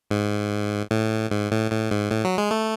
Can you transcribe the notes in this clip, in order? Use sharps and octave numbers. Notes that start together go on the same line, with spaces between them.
G#2
A2
G#2
A2
A2
G#2
A2
F#3
G#3
A3